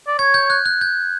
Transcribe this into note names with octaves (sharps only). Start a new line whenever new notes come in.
D5
C#5 G#6
G6
F#6
F#6
G6